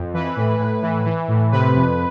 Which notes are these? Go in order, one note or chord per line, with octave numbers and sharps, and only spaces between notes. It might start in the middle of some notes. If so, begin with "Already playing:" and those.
Already playing: F2
E3 B4
A2
A2
E3
E3
A2
C3 B4
F2